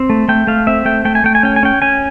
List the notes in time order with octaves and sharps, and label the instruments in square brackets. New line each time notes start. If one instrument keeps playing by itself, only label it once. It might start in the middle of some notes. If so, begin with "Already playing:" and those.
Already playing: [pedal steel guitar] C4
A3
A3 G5
A3 F5
C4 E5
A3 G5
A3 G5
G#5
A3 G5
G#5
C#4 G5
G#5
C#4 G5
C#4 G#5